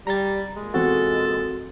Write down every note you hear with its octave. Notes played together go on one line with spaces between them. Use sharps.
G3 A#5 A6
A#2 G#3
E2 C4 F#4 A4